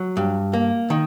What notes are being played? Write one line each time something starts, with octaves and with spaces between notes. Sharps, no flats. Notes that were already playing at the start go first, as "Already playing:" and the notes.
Already playing: F#3
G2
A#3
D#3